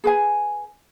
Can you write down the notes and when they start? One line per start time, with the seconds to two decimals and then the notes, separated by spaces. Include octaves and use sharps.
0.04 G#4 B4 G#5